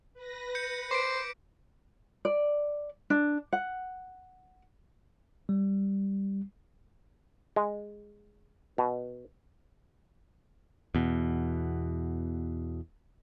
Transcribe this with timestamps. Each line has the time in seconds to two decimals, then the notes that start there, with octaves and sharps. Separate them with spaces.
0.14 B4 A#6
0.55 G6 C#7
0.91 C5 D6 B6 D7
2.25 D5
3.10 D4
3.53 F#5
5.49 G3
7.56 G#3
8.78 B2
10.95 E2 B2